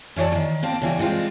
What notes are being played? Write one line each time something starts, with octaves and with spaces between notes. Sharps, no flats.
F#2 E3 C#5 D5 A5
D#3 E3
A#3 C4 A5
C#3 E3 G3
G3 G#3 C4 F4